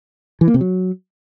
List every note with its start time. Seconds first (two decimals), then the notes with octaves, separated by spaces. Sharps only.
0.41 E3
0.48 A#3
0.54 C3
0.61 F#3